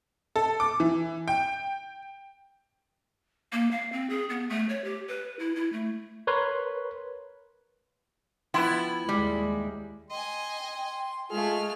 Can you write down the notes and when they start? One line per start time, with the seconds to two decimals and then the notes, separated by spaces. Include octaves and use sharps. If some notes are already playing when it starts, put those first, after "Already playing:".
0.36 A4
0.60 D6
0.80 E3
1.28 G5
3.52 A#3
3.71 F5
3.92 C4
4.10 G#4
4.30 B3
4.50 A3
4.69 C#5
4.84 G4
5.08 B4
5.39 E4
5.55 E4
5.73 A3
6.27 A#4 B4 C#5 C6
8.54 F3 B3 E4 G5 C6
9.09 D#2 G3 G#3
10.11 D#5 G5 G#5 C6
11.31 G#3 A3 F4 G#4 F6